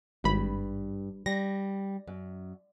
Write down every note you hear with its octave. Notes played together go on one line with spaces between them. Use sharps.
G#1 G2 B5
G3 A#6
F#2